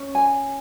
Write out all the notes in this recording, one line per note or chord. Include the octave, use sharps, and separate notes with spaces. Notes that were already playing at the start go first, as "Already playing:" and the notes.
Already playing: C#4
G#5